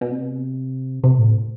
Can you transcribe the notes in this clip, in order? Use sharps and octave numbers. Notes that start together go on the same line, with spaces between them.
B2
C3
C3
A2